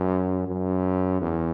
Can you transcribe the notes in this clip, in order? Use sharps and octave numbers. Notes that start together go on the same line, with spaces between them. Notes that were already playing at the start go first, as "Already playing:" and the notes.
Already playing: F#2
F#2
E2